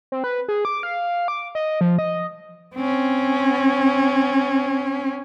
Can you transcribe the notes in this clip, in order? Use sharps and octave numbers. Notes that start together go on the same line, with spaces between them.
C4
B4
G#4
D6
F5
D6
D#5
F3
D#5
C4 C#4